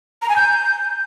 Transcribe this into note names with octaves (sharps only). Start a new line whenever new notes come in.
A#5
G#5
G6